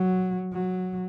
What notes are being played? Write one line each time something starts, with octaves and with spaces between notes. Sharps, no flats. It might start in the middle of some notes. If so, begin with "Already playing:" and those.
Already playing: F#3
F#3